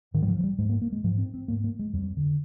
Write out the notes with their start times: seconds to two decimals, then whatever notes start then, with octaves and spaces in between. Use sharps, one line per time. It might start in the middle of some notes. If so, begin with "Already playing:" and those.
0.14 G#2 D#3
0.22 G3
0.28 F3
0.39 F3
0.44 G3
0.58 G#2 G#3
0.69 A#3
0.82 A#3
0.92 G#3
1.04 G#2 F3
1.18 C4
1.34 C4
1.48 G#2 A#3
1.64 A#3
1.79 G#3
1.93 F2 G3
2.17 D3